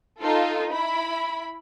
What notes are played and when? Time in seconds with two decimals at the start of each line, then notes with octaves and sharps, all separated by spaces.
0.21 D#4 F4 A4
0.73 E4 B5